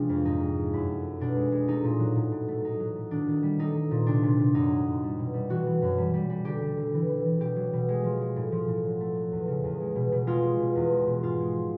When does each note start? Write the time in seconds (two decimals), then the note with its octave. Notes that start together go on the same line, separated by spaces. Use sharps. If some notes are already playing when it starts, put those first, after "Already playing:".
Already playing: C3 F3 G#3 D4
0.09 F2
0.25 G#2 D#4
0.41 G#2
0.56 G#3
0.73 F#2 E4
0.89 A3
1.04 A3
1.20 B2 D4
1.36 G#3
1.52 G#3
1.68 A3 D#4
1.84 A#2
2.00 F#3
2.15 A2
2.31 A2
2.48 A3
2.64 A3 D#4
2.80 F#3
2.96 A3
3.11 D#3 D4
3.28 D#3
3.43 G3
3.59 A3 D#4
3.75 A3
3.91 A#2
4.07 C3 D4
4.23 C3
4.39 C3
4.54 F#2 D#4
4.70 F#3
4.86 F#2
5.03 G3
5.19 B2
5.34 G3
5.49 E3 F#4
5.67 E3
5.82 F#2
5.98 G3
6.14 G3
6.30 G3
6.45 D3 G4
6.62 G3
6.77 D3
6.94 E3
7.09 E3
7.25 E3
7.40 B2 G4
7.56 F#3
7.73 B2
7.89 G#3
8.04 F3
8.21 G#3
8.36 A2
8.52 F3
8.68 A2
8.84 F#3
9.01 A3
9.16 F#3
9.31 E2
9.48 C#3
9.64 E2
9.80 G#3
9.96 B2
10.12 B2
10.27 G#3 F4
10.42 G#3
10.60 B2
10.76 E2
10.91 G#3
11.06 B2
11.22 G#2 F4
11.39 G#3
11.54 F3